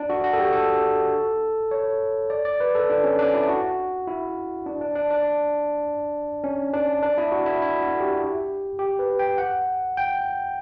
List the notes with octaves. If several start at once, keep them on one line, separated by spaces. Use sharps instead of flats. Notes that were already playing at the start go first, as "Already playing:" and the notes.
Already playing: D4
F#4
F#4
A4
G4
A4
C#5
D5
D5
B4
A4
D4
C#4
D4
E4
F#4
E4
D4
D4
D4
D4
C#4
D4
D4
E4
F#4
E4
E4
F#4
G4
G4
B4
G5
F#5
G5